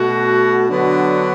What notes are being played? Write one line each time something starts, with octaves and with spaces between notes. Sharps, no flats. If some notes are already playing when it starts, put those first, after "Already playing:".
Already playing: B2 A3 F#4
D3 F#3 B3 D4 F#4